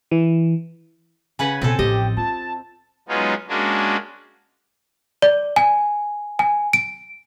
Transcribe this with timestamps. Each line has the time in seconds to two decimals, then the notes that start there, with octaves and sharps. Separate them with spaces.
0.11 E3
1.39 C#3 B4 F#5 G#5
1.62 B2 C4 A4
1.79 A1 F3 G4 D#5
2.17 F4 A5
3.09 F#3 G#3 B3 C#4 D#4 F4
3.48 G#3 A#3 C#4 D4 F#4
5.22 D5
5.56 G#5
6.39 G#5
6.73 D7